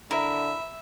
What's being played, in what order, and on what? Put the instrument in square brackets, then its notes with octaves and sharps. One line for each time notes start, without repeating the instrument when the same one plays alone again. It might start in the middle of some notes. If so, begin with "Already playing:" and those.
[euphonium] D3 [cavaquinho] E4 [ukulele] A#4 [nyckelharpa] E5